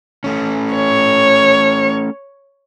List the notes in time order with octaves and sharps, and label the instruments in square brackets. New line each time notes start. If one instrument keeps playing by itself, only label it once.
[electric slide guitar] A3 C#4
[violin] C#5